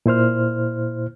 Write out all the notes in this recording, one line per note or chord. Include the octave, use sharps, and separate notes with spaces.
A#2 E4 C5 F6